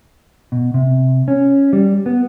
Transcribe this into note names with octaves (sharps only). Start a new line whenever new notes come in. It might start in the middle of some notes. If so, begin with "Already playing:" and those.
B2
C3
C#4
G3
B3